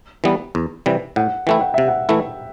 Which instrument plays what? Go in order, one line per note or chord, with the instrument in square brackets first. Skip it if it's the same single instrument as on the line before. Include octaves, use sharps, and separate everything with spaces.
[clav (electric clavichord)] E3 G3 B3
E2
C3 E3 G3
[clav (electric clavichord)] A2 [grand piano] F#5
[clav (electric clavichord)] E3 A3 E4 [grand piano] G5
[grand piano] F#5
[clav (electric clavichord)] C3 [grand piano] E5
[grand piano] F#5
[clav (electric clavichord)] E3 A3 E4